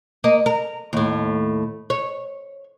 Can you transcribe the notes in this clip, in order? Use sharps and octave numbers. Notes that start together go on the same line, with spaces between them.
A#3 D#5
A#4
D#2 A2
C#5